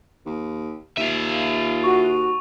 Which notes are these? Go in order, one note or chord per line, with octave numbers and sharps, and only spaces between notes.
D#2
D#2 F4 E5 D#7 F7
F#4 C#6